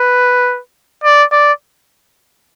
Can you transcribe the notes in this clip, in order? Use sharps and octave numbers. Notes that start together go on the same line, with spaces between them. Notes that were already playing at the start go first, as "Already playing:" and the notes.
Already playing: B4
D5
D5